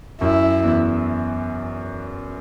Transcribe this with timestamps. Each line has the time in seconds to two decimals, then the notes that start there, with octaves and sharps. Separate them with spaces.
0.21 F#2 E4
0.63 E2